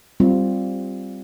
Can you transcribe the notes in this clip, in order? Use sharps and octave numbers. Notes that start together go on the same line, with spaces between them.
G3 C4 F4